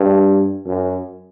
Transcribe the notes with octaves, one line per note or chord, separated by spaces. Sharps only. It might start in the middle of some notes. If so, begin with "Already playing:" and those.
Already playing: G2
F#2